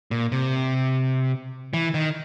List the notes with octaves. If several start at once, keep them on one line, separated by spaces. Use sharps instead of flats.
A#2
C3
E3
D#3